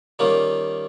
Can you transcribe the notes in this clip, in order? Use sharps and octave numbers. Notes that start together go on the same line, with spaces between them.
D#3 G3 A#3 C#4 F4